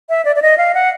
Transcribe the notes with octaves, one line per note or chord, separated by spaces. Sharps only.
E5
D5
D5
D#5
F5
F#5